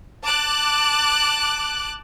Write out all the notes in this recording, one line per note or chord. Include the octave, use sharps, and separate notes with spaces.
A5 D6 F#6